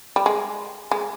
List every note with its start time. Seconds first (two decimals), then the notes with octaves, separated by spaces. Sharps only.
0.16 G3
0.26 G#3
0.91 G#3